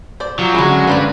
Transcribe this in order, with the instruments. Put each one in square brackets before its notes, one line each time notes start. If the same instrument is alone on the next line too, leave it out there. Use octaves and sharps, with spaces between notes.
[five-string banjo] C5 D5
[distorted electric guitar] F3 [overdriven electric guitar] F#3
[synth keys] D3 C#4 A#6 [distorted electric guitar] G#3 [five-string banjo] E4 F#4
[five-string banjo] A#3 C5 D5 [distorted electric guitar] D4 B4